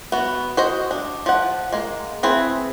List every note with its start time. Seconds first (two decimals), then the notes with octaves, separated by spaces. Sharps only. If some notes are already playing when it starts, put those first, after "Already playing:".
0.12 B3 F#4
0.57 F#4 C5 D#5
0.91 D4
1.26 F3 F#5
1.72 G#3 A#3
2.23 C4 E4 G#4 B4